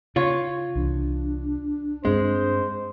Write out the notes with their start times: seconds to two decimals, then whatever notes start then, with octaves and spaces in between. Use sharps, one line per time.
0.16 C#3 F4 C#5
0.75 C2 E3 D4
2.05 G2 G#3 C4 C5